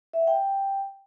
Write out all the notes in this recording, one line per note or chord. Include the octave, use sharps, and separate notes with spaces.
E5
F#5
G5